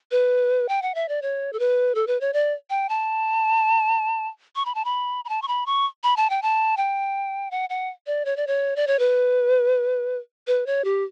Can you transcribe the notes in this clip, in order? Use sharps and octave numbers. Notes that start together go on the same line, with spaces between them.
B4
G5
F#5
E5
D5
C#5
A4
B4
A4
B4
C#5
D5
G5
A5
C#6
B5
A5
B5
B5
A5
C#6
B5
C#6
B5
A5
G5
A5
G5
F#5
F#5
D5
C#5
D5
C#5
D5
C#5
B4
B4
C#5
G4